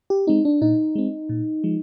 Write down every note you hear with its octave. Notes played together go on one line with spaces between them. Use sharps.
G4
G#3 C4 D#4
D4
A#2 D#4
G#3 C4
A#2
F3 G#3